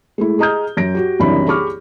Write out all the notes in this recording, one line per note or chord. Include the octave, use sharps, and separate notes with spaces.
G#3 A3 E4
G#4 D#5 A#5 D#6 F6 G6
F#2 A#6 D7
F#4 G4
F#1 C2 F#2 E3 D4 B5
G4 G#4 B5 C#6 D6 F6